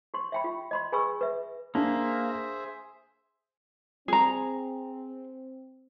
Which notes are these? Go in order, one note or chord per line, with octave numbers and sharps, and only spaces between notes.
G4 C6
E5 G5 B5
F4 G4
D#5 B5 C6
G#4 B4 G#5 B5 C#6 E6
B4 E5
A#3 D4 G#4 C5 E5
C4 G#4 A#5